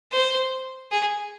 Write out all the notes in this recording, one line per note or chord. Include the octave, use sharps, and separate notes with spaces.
C5
G#4